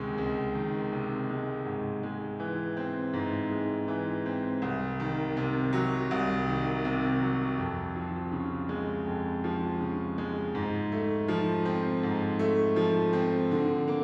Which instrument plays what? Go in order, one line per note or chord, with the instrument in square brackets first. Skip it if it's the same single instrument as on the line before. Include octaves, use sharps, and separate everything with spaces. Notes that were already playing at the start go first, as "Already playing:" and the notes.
Already playing: [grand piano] C#2 C3 D#3 G#3
C#2
D#3
C3
G#3
G#2
G#3
E3
C4
G#2
G#3
E3
C4
C2
D#3
C3
F#3
C2
D#3
C3
F#3
F2
F3
C#3
G#3
F2
F3
C#3
G#3
G#2
A3
F3
C4
G#2
A3
F3
C4
D3
A#3